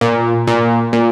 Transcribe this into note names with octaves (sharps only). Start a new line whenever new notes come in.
A#2
A#2
A#2